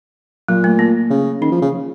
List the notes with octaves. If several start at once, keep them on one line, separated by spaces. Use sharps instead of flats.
A#2 F#3
A3
A#3
C#3
D#3 C#4
F3
C#3